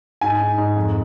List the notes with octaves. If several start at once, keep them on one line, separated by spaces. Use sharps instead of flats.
G#2 G#5
D#4
G#2
F2